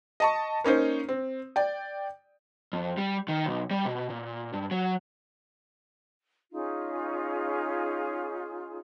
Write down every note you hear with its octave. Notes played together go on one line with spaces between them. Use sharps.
D#5 A5 C#6
A#3 C#4 D#4 C5
C4
D5 G5
F2
G3
D#3
B1
G3
B2
A#2
G2
F#3
C#4 D#4 F4 G#4